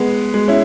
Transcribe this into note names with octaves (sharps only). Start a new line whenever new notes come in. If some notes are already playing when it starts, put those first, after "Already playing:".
Already playing: G#3 B3
G#3
C#4 E4